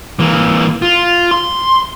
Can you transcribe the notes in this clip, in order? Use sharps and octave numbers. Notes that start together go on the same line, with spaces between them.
E3 A#3
F4
C6